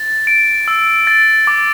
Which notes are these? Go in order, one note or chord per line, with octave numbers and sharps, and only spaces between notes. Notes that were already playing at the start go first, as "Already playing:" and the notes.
Already playing: A6
D7
E6
A6
D6